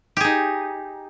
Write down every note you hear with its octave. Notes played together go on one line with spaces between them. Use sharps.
D#4 G4 G#4